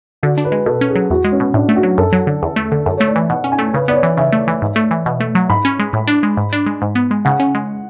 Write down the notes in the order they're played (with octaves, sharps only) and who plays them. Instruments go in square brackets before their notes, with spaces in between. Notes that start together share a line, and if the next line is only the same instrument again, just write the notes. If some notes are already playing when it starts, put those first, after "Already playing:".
[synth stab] D3 [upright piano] F#4
[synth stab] D4
[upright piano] B4
[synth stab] G#3
[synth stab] B2 [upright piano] A4
[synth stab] C#4
[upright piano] G#4
[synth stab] F#3
[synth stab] E2 [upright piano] F#4
[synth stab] G#3
[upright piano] C#4
[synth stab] B2
[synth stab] A2 [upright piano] D4
[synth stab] A3
[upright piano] F#4
[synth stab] F#3
[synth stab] F#2 [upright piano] A4
[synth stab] F#3
D3
E2
A3
D3
[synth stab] F#2 [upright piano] A4
[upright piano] C#5
[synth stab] A3
[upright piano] D5
[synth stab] E3
[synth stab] B2 [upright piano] F#5
[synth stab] C#4
[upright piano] G#5
[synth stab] A3
[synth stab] C#3 [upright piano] B4
[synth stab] B3 [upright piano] D5
[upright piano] C#5
[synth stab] E3
[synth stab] C#3 [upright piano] E5
[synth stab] A3
E3
G#2
A3
E3
B2
A3
F#3
[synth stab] G#2 [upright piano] B5
[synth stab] C#4
G#3
A2
D4
G#3
G#2
D4
G#3
G#2
B3
G#3
[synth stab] C#3 [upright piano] F#5
[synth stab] C#4
G#3